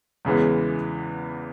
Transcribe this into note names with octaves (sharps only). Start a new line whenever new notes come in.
E2 C#3 E3 G#3 B3